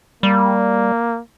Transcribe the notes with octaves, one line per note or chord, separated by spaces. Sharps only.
G3 A#3